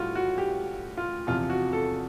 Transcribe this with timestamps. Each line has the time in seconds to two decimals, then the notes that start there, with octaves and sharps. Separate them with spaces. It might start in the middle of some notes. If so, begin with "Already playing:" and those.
Already playing: A2 E3 G3 F4 F#4
0.15 F#4
0.38 G4
0.97 F4
1.27 E2 C3 F3 F4
1.50 F#4
1.73 A4